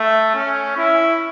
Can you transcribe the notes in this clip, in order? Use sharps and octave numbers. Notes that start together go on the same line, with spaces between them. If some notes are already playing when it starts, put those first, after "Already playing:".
Already playing: A3
C#4
E4